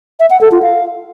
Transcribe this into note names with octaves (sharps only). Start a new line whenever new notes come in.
E5
F#5
A4
F4
F5